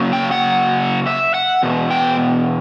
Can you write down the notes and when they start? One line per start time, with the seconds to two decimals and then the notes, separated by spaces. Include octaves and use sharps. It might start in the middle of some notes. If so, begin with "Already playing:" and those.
Already playing: C#3 F#3 A#3
0.13 G5
0.31 F#5
1.07 E5
1.34 F#5
1.63 E2 B2
1.91 G5